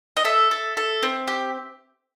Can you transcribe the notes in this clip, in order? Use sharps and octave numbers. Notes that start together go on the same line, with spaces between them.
D#5
A4 E5
A4
A4
C4
G4